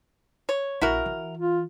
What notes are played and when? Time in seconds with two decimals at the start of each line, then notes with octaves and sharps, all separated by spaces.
0.49 C#5
0.81 A#1 E4 F#4 A#4
1.06 E3
1.37 F4